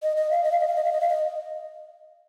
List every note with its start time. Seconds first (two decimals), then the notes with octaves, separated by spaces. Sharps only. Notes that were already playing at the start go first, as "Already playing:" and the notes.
0.03 D#5
0.17 D#5
0.31 F5
0.44 D#5
0.52 F5
0.60 D#5
0.68 F5
0.76 D#5
0.84 F5
0.93 D#5
1.01 F5
1.09 D#5